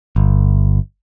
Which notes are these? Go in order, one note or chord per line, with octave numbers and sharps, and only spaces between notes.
G1